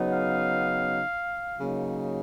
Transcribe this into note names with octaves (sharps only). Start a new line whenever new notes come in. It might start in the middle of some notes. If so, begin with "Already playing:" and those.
Already playing: C#3 F#3 B3 D#4
F5
C#3 F#3 A#3 D#4